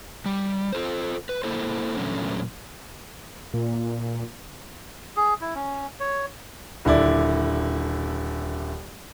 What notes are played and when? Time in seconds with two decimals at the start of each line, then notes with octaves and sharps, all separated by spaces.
0.26 G3
0.73 F4 A4 C5
1.29 B4
1.44 A#3 E4 A4 C5
1.97 E2 A#2 D3 F#3 A3 C#4
3.54 A#2
5.16 G#4
5.41 E4
5.55 C#4
6.00 C#5
6.85 D#1 D3 E4 D5